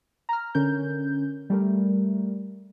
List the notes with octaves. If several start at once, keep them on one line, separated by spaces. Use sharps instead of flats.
A#5 F6
D3 C#4 A#4 G6
G3 A3 A#4